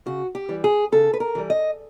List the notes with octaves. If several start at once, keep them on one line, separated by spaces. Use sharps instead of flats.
C#3 F#4
G4
E3 G3
G#4
C#3 A4
B4
A#4
E3 G3
D#5